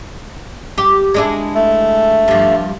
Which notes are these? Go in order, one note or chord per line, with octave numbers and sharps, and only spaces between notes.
G4
G#3 D4 E4
A3
G2 F3